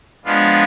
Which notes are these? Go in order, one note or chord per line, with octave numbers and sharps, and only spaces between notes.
F3 G#3 B3 D4 F4